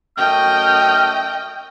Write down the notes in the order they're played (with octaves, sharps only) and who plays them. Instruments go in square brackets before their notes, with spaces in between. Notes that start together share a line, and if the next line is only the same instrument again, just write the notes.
[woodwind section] F#2 A3 F6 [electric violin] D#5 G5